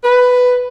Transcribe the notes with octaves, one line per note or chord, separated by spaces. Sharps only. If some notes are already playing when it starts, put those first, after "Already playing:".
B4